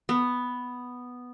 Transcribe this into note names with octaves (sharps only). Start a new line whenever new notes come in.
B3